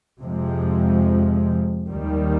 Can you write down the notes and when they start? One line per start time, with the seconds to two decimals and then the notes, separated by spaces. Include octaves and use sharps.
0.21 F2 C3 F3 G#3
1.88 D#2 D#3 G3